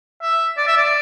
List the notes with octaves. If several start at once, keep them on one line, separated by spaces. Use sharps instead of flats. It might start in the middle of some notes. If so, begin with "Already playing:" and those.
E5
D5
E5
D5